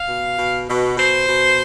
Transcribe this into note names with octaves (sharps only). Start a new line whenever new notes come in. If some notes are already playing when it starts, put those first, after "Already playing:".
Already playing: F5
B2
B2
B2
B2 C5
B2